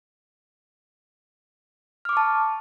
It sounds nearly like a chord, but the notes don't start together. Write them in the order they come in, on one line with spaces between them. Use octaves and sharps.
F6 D6 C#6 A5